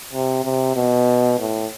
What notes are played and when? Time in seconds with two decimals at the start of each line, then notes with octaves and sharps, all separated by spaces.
0.13 C3
0.45 C3
0.76 B2
1.39 A2